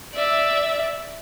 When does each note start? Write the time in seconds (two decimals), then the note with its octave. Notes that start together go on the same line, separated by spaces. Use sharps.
0.15 D5 E5